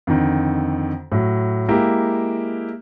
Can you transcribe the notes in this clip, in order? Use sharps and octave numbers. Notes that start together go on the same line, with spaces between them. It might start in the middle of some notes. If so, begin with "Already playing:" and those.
F2 D3 D#3
A2 F#3
G#3 A#3 E4 G4